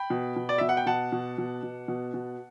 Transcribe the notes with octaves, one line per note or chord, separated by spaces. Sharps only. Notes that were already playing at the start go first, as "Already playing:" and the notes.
Already playing: G5 B5
B2
B2
D5
B2 E5
F#5
G5
B2 F#5 A5
B2
B2
B2
B2
B2